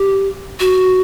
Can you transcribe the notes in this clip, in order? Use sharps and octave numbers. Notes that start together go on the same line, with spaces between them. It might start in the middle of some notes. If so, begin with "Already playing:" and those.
Already playing: G4
F#4